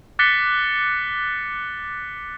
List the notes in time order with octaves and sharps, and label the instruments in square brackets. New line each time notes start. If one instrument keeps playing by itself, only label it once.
[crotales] D6 F#6 A6 B6 C#7 G7